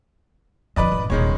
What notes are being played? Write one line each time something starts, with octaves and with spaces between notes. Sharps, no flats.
F2 D3 B4 D5 D#5
G#1
D#1 C3 D#3 G#3 C#5